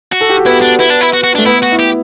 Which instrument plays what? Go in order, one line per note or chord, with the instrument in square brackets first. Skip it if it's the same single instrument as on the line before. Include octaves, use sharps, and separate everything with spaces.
[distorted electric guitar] F#4
[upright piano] A4
G4
F#4
[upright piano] B3 [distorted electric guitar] E4
[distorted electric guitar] D4
[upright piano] B3 [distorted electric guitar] E4
[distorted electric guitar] D4
E4
F#4
F#4
D4
[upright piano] A3
[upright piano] B3 [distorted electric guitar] E4
[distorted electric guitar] F#4
[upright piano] E4
[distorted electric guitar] G4